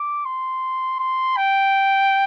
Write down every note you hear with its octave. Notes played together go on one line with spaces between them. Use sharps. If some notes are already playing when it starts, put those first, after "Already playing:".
Already playing: D6
C6
C6
G5